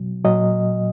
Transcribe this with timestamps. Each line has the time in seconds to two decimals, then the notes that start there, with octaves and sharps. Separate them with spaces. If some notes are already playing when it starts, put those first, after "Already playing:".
Already playing: B2 F#3
0.25 A#2 F#3 D#5